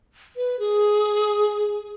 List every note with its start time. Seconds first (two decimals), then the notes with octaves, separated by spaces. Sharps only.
0.37 B4
0.59 G#4